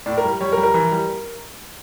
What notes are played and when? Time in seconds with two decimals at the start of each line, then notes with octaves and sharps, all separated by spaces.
0.06 A2 D5
0.18 A#4
0.24 G3
0.41 G3 C#5
0.53 A#4
0.57 G3
0.63 A#4
0.74 E3
0.92 G3